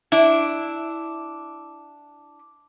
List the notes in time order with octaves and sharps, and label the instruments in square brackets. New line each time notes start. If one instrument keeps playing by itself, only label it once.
[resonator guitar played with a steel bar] D4 E4